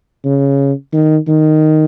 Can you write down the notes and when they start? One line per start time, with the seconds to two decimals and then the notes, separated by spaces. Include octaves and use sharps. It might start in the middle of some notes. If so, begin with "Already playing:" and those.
0.24 C#3
0.93 D#3
1.28 D#3